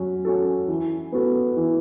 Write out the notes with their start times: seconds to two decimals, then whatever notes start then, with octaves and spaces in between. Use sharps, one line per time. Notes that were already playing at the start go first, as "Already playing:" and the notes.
Already playing: F#3 C#4
0.25 C#4 F#4 A4
0.68 E3
1.12 B3 F#4 A4
1.57 E3